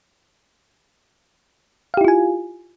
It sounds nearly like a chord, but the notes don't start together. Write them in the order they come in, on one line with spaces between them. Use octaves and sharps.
F5 G4 E4 F4 G#5